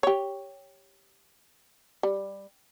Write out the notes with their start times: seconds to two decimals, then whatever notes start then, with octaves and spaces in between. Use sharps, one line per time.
0.03 G4 C#5
2.03 G3